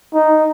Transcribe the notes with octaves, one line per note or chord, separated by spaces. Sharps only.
D#4